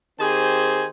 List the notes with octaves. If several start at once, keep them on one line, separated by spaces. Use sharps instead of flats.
D#3 C4 G4 G#4 C5 G#5